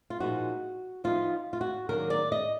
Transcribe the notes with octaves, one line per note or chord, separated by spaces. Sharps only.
F4
A#2 F3 G#3 D#4 F#4
F3 B3 D#4 F4
F4
F#4
D#3 F#3 A#3 D4 A#4
D5
D#5